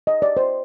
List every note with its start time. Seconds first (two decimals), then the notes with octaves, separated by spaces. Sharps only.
0.07 D#5
0.22 D5
0.37 C5